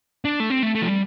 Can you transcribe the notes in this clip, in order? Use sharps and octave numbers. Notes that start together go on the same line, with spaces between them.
D4
A3
C4
A3
A3
F3
G3